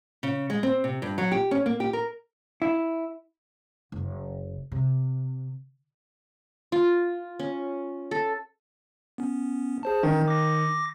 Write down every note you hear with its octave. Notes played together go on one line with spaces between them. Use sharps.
C#3
G#3
C4
C3
G2
F#3
G4
C#4
A#3
G4
A#4
E4
F#1
C3
F4
C#4
A4
B3 C#4
G#4 C5 A5
D#3 E3 C#4 D#4
D6 A#6